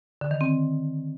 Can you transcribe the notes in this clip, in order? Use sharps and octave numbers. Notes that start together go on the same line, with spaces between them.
D3
D#3
C4